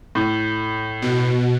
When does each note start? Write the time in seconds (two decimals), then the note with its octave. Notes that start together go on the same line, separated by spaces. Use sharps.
0.15 A2
1.02 B2